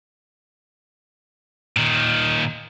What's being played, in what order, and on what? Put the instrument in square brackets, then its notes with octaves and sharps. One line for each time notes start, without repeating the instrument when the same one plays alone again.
[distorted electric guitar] A#2 D#3